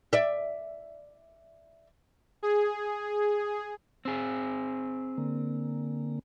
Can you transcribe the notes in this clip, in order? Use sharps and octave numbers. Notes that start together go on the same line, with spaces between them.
D5 E5
G#4
C4 G#4
D3 A#3